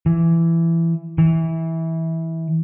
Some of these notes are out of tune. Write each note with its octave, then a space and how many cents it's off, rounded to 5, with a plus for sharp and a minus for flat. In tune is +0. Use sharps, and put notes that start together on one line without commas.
E3 +15
E3 -20